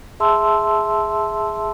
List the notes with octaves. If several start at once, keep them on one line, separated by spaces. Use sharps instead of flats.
G#4 E5 A5 C6 E6